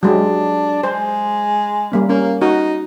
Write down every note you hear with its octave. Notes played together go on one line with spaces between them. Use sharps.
F#3 G#3 D4 G4
G#3 C5
G3 A#3 C#4
A#3 C#4
D#4 F#4